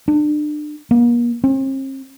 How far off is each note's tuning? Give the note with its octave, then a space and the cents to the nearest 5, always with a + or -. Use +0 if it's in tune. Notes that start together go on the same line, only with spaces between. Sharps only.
D4 +35
A#3 +40
C4 +45